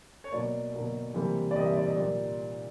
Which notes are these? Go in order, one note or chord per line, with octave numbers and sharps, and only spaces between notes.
C#5
B2 F#3 A#3 D5
B2 F#3 A#3
C3 E3 G3 A#3
D5
C3 E3 G3 A#3 D#5
E5
D5
D#5
A#2 G3 A#3 D5